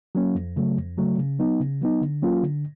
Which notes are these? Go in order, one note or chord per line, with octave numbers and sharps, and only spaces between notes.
F#3 A#3 C#4
F2
C#3 F#3 A3
F2
C#3 F#3 A3
C#3
F#3 B3 D#4
C#3
F#3 B3 D#4
D3
F#3 A#3 C#4 F4
D3